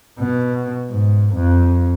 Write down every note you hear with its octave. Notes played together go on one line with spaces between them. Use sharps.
B2
G#2
F2